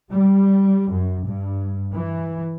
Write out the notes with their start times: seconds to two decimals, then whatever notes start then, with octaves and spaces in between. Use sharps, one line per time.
0.11 G3
0.90 F#2
1.25 G2
1.94 E3